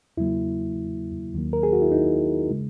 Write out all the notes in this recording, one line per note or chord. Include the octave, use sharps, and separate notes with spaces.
E2 C#3 F#3 A#3 E4
D#2 D#3 F#3 A#3
A#4
G#4
F#4
E4
D#4
C#3 G#3